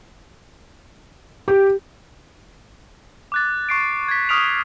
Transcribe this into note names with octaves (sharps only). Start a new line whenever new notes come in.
G4
D6 F#6 A6
C#6 C7 D7
G#6 B6
C#6 D#6 F6 B6 D7 F7